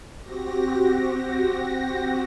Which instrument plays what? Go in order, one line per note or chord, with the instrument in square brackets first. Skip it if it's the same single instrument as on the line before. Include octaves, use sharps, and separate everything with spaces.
[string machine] C4 F#4 G4 A#6